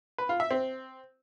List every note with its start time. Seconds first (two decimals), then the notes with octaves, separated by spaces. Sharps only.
0.18 B4
0.29 F4
0.40 E5
0.51 C4